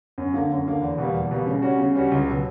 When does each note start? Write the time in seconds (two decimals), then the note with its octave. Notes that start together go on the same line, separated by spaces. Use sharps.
0.18 F#2
0.34 D3 A#3
0.50 F#2
0.66 D3 A#3
0.82 E2
0.98 B2 G3 A#3
1.14 E2
1.31 B2 G3 A#3
1.47 C#3
1.62 G3 C#4 F#4
1.78 C#3
1.95 G3 C#4 F#4
2.12 C#2
2.28 B2 F#3